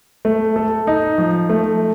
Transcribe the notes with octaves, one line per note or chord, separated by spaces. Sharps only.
A3
A4
D#4
F3
A3